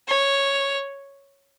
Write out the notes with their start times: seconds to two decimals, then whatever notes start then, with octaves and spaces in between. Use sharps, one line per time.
0.08 C#5